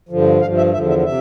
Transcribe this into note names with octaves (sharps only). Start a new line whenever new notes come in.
G2 D3 F3
G2 F3 F5
E5
E2 D3 F3 E5
E5
C3 E5